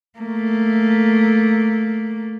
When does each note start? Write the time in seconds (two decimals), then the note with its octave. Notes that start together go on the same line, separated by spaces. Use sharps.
0.19 A3 A#3